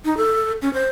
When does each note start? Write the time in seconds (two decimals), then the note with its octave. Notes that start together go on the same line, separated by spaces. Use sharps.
0.05 D#4
0.17 A4
0.62 C#4
0.74 C5